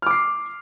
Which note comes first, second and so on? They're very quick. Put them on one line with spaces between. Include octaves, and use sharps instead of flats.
F6 D6 C7